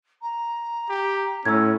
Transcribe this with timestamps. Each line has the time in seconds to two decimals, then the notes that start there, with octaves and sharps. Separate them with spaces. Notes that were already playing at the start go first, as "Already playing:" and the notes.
0.22 A#5
0.90 G4
1.45 A2 C#4 E6 G#6